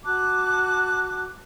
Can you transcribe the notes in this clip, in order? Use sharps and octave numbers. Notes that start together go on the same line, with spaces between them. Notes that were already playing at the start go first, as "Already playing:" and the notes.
F#4 A5 D6 F#6